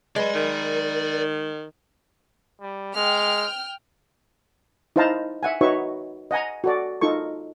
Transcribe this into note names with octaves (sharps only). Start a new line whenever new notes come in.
G#3 B4 D5 B5
D#3 A#4
G3
G#3 G5 F6
D#4 E4 C5 F5 A5 A#5
E5 F#5 G#5
D#4 F#4 B4 C#5 E5 C#6
D#5 F#5 G#5 A#5
F#4 A4 D5
D#4 F4 A4 C#6